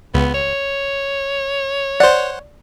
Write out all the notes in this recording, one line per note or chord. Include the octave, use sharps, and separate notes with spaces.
C#2 B3
C#5
C5 D5 F#5